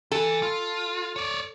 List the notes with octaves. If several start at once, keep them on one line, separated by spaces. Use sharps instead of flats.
E3 A4
F4
C#5 D5